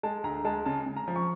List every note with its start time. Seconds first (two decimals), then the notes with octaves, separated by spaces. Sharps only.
0.03 G#3 A5
0.24 D2 A#5
0.45 G#3 A5
0.66 C#3 A5
0.86 C#3
0.97 A#5
1.08 F3
1.16 C#6